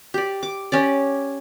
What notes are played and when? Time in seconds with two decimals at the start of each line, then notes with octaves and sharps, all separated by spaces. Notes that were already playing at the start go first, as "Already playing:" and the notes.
0.14 G4 D5
0.43 D6
0.72 C#4 G4 D5